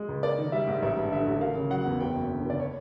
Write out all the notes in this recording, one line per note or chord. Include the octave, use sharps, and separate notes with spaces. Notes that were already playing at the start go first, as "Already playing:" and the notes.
Already playing: G#3
C#2
A#3 D5
D#3
G3 E5
G#2
A1 E5
G2
D3 E5
A1
A#3 F5
C#3
F#3 F#5
E2
F#1 G5
F#2
D3
F#1 D5
C#5